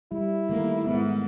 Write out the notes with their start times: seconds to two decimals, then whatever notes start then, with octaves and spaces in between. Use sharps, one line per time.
0.12 G3 E4
0.49 D#3 G3 A3 A#3
0.87 G#2 B3